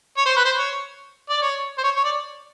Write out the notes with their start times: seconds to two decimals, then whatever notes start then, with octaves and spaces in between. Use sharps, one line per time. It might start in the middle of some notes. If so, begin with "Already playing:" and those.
0.17 C#5
0.26 C5
0.36 B4
0.45 C5
0.58 C#5
1.29 D5
1.42 C#5
1.78 C5
1.83 C#5
1.96 C#5
2.04 D5